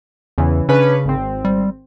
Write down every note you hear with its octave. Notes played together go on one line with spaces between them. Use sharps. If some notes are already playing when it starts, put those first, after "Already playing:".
E2 C#3 E3
C#3 C#4 D4 B4
G#1 C4
G3